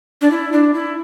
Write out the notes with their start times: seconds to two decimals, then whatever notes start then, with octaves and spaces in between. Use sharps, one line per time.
0.21 D4
0.31 E4
0.52 D4
0.74 E4